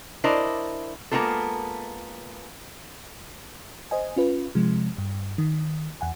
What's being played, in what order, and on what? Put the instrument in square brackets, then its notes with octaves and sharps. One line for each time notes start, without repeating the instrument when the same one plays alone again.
[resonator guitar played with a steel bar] D4 E4 A#4 C5 D5 D#5
G#3 A#3 B3 E4 F4 A4
[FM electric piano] C5 D#5 G#5
C#4 F4 B4
C3 F3 G#3
G2
D#3
E2 F#5 G#5